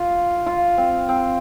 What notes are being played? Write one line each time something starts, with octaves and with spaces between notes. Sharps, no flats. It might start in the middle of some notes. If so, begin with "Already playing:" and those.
Already playing: F4
F4
C4
C4